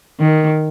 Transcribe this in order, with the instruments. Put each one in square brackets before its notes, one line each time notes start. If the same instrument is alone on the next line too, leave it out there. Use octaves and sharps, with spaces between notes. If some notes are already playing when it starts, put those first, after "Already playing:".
[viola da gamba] D#3